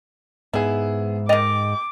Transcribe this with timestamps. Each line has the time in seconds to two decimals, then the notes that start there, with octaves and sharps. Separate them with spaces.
0.54 G#2 B3 E4 G#4
1.29 D#3 D#5 G5 D6 A6 F7